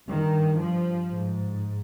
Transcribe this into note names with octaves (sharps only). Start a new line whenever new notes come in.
G2 D#3
F3
G#2